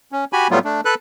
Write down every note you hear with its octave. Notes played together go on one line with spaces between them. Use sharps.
C#4
F#4 G4 G#5 B5
A2 F#3 G3 A3 B3 F4
A3 D4
A4 B4 F#6